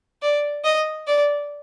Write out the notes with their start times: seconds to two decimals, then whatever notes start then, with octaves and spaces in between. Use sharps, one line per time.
0.22 D5
0.64 D#5
1.07 D5